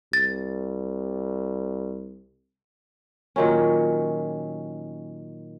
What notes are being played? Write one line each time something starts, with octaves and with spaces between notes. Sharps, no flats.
C2 A6
A#2 D#3 F#3 C#4